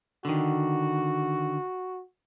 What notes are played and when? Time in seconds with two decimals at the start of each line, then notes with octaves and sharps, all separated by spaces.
0.25 D3 D#3 F#4